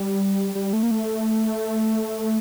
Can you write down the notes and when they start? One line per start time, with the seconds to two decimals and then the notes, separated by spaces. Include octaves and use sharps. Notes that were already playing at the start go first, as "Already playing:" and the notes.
Already playing: G3
0.55 G3
0.73 A3
0.83 A#3
0.91 A3